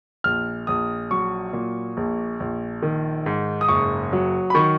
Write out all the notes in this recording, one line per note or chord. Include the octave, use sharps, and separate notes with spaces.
A#1 F6
A#1 D#6
F#3 C#6
A#2
A#1
A#1
D#3
G#2
D#6
F#1 C#6
F#3
B5
D#3 C#6